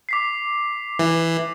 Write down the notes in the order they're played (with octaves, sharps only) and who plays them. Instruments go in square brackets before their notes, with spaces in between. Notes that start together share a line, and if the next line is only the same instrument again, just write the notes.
[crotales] D6 B6 C7
[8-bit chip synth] E3